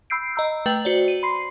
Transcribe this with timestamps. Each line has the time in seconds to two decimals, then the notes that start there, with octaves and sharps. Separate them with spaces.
0.10 B5 E6 G6 C7 D7
0.36 D#5 A#5 E6
0.66 A3 B4 G5 G6 F#7
0.85 F#4 C5 D5
1.08 D#7
1.23 B5 C6 C7